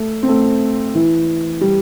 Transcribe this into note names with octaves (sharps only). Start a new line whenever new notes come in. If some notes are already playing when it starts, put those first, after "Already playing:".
Already playing: A3
C4
A3
E3
G3